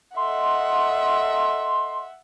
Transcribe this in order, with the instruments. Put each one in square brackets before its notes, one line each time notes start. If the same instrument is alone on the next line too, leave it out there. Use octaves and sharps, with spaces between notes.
[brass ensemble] A4 D#5 [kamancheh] E5 F#5 [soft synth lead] C6